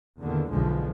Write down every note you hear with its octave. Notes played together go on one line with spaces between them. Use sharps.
E2 A#2 D3 D#3
B1 E2 D3 F3 G#3